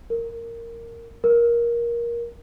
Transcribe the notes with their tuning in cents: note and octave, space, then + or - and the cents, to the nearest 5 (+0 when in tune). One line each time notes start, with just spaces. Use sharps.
A#4 -10
A#4 +15